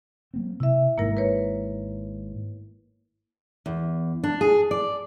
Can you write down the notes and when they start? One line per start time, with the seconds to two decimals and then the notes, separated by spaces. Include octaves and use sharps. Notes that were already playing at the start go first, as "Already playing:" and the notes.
0.34 F#3 A#3 C4
0.60 C3 E4 E5
0.98 G#1 G#2 A#3 E4 A#4
1.17 B4 C#5
3.66 E2
4.24 D4
4.41 G#4
4.71 D5